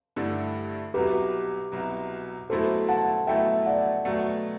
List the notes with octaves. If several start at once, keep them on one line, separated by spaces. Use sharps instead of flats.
G2 D3 A3 E4
C2 B2 F#3 G4 B4
C2 B2 F#3
B2 F#3 A3 E4 A4 C5
F#5 A5
B2 F#3 A3 E4 E5 G5
D5 F#5
B2 F#3 A3 D5 F#5